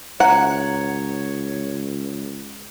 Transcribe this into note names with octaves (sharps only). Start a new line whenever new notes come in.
C#2 C#5 F#5 A#5